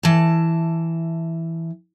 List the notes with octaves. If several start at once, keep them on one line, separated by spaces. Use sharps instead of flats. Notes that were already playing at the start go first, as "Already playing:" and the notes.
E3 A5